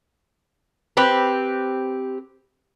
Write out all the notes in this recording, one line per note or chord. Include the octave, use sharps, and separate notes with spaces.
C4 G4 B4